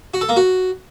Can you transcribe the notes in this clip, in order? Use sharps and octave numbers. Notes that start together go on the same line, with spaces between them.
F#4
A4
A#3
F#4